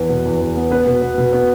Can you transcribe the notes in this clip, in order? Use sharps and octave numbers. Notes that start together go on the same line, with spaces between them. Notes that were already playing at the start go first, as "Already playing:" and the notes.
Already playing: E2 B3 B4
B2
E2
E2
B3
B3 B4
B2
B3
B2
B3